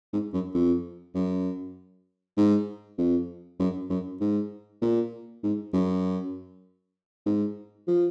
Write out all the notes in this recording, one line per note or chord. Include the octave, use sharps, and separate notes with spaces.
G#2
F#2
F2
F#2
G#2
F2
F#2
F#2
G#2
A#2
G#2
F#2
G#2
F3